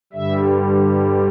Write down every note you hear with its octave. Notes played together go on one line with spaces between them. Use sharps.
G2 D3 G3 E5